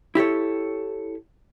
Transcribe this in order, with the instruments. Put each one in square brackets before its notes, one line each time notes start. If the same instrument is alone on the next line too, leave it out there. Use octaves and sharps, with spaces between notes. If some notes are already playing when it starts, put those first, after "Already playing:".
[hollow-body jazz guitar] E4 G4 A4 C#5